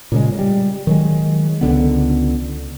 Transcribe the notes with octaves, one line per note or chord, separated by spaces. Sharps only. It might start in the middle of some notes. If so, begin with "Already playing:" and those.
A#2 C#3 G#3
G3
D#3 F#3 G#3
C#2 D3 B3